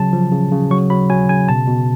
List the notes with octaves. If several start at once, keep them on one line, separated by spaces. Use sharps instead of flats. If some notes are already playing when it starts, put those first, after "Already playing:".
Already playing: C#3 F#3 A5
F3
C#3
C#3
F#3 C#6
F#3 B5
F#3 G#5
C#3 G#5
B2 A5
B2